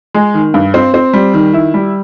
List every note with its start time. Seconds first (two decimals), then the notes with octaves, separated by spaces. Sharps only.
0.14 G#3
0.34 D#3
0.54 G2
0.74 C4
0.94 C4
1.13 G3
1.34 D#3
1.53 E4
1.74 G3